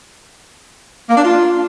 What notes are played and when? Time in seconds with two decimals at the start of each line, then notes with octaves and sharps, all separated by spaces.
1.10 A#3
1.17 D4
1.24 F4